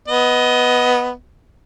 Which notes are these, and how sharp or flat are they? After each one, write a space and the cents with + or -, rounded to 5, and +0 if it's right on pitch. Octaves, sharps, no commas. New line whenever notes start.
B3 +0 D#5 +15